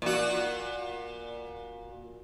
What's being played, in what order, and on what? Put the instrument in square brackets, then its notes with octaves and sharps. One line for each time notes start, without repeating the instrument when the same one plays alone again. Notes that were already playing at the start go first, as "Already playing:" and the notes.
[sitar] A#2 F#4